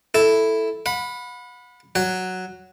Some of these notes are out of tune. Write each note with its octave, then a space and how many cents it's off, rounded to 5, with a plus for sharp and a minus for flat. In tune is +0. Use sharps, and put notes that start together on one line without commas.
E4 +0 A4 +0
F#5 -40 B5 +0
F#3 +0 F#5 +0